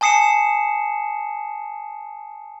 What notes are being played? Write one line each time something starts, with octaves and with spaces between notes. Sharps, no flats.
G#5 A5 D#6 C7 C#7 E7